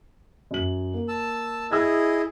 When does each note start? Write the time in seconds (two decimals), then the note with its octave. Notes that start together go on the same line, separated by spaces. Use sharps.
0.51 F#2 F#7
0.94 A#3
1.08 A5 E6
1.71 E4 G#4 D#5 E6 G#6